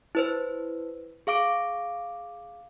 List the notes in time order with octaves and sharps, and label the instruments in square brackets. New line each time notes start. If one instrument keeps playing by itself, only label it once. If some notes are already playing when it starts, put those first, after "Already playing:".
[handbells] E4 B4 C5
G#4 F5 D6 D7